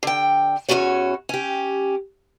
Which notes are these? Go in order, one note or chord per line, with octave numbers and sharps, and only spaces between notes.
D3 G5
E2 G2 C#4 F#4 C#5
C#4 G4